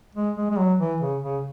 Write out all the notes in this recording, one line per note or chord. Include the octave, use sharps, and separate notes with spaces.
G#3
G#3
G#3
F#3
E3
C#3
C#3